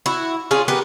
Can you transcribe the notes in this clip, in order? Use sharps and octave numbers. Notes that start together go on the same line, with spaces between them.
E4 F#4
C#4 F4 G#4
B3 G4 A#4 B4